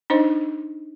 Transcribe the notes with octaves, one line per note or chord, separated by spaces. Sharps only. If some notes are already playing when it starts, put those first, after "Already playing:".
D4 D#4 C5 D#5